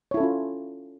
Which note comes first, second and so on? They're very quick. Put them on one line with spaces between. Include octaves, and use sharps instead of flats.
C#5 E4 A4 C#4 F4